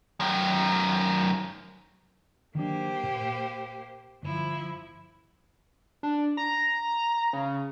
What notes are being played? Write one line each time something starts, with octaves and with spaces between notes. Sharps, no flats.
F#2 D#3
D#3 F#3 A#3 D4 G4 C5
A#2
G1 F3 E4
D4
A#5
C#3